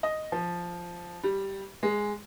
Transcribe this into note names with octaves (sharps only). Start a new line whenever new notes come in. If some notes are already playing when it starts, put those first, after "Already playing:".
D#5
F3
G3
G#3